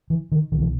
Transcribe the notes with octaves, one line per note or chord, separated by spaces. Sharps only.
E3
D#3
C2 B2 D#3
E3